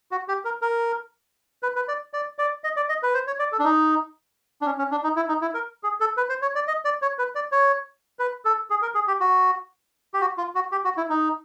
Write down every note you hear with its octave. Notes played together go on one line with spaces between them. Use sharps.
F#4
G4
A#4
A#4
B4
B4
D5
D5
D5
D#5
D5
D#5
B4
C5
C#5
D5
A4
D4
D#4
D4
C#4
C#4
D4
D#4
E4
D#4
E4
A#4
G#4
A4
B4
C5
C#5
D5
D#5
D5
C#5
B4
D5
C#5
B4
A4
G#4
A#4
G#4
G4
F#4
G4
F#4
F4
F#4
G4
F#4
E4
D#4